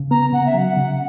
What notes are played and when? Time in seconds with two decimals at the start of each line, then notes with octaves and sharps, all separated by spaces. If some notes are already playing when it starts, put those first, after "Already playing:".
Already playing: C#3
0.11 B3 A#5
0.33 C#3 F#5
0.46 E5
0.54 F#3 F#5
0.77 C#3